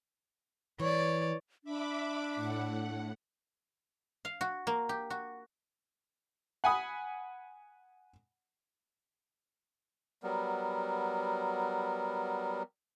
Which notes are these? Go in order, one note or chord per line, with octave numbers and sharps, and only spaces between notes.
E3 C#5 D5
D4 E5 B5 D6
A2 F#5
F5
F#4
A#3
G4
F#4
F#5 G#5 B5 D#6
F#3 G3 B3 A#4